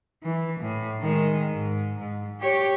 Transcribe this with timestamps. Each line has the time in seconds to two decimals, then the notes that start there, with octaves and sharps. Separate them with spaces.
0.23 E3
0.60 A2
1.01 D#3 G#3
1.52 G#2
1.99 G#2
2.41 G4 C#5